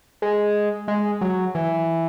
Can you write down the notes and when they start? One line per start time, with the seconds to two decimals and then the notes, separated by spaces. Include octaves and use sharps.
0.22 G#3
0.88 G#3
1.21 F#3
1.55 E3